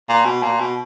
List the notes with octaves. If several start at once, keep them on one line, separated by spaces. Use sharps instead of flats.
A#2
B2
A#2
B2